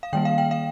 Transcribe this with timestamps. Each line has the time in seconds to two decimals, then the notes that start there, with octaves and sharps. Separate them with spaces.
0.03 F5
0.13 D#3 G3 A#3 G5
0.25 F5
0.38 G5
0.51 F5